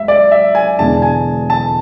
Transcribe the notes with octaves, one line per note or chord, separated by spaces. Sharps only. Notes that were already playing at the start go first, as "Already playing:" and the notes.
Already playing: G#2 E5
D5
E5
G#5
E1 E2 D3 G#3 D4 A5
G#5
A5